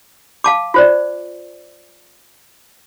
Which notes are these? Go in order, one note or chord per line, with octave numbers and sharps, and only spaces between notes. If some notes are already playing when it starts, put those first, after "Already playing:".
F5 A5 D6
F4 C5 D5